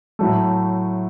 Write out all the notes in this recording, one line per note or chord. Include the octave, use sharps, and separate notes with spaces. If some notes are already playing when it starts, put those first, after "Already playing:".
A2 F#3 A3